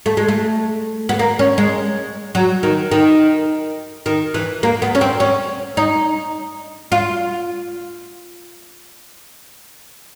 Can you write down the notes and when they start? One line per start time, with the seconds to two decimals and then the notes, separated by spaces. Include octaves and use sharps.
0.06 A3
0.17 G#3
0.28 A3
1.09 B3
1.19 A#3
1.39 C#4
1.58 G#3
2.35 F#3
2.63 D#3
2.91 D#3
4.06 D#3
4.34 E3
4.63 A#3
4.82 B3
4.95 C#4
5.01 C4
5.20 C#4
5.77 D#4
6.92 F4